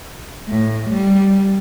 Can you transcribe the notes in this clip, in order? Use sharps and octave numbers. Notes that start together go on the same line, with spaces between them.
A2
G3